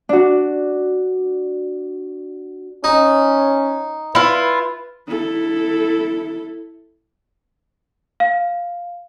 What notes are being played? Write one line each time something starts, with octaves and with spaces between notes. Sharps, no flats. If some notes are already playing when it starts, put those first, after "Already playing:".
D4 F#4
C#4 D#4
E4 F4 B4
E4 A4
F5